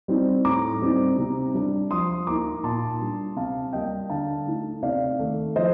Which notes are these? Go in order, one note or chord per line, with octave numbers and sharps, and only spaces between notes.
G3 C4 D#4
A2 A#5 D6
G3 C4 D#4
C3
G3 D4
F3 C6 D#6
A#3 D#4 A#5 D6
A#2 A5 C6
G3 D4
C3 F5 A5
G3 A#3 D#5 G5
D3 F5 A5
A3 D#4
C3 D5 F5
D#3 A3
F3 C5 D#5